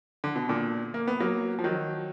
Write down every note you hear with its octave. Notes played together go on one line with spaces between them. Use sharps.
D3
B2
A#2 D3
A#3
B3
F#3 A#3
F3
D#3 F#3